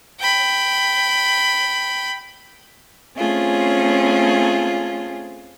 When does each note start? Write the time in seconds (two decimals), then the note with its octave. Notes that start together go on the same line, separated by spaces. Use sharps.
0.20 G5 B5
3.17 A3 C4 C#4 F4 G#4